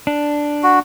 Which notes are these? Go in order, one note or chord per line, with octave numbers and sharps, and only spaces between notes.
D4
F#4